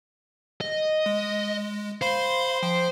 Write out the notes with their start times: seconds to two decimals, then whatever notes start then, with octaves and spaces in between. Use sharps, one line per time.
0.61 D#5
1.06 G#3
2.02 C5 F5 B5 C6
2.63 F3 G5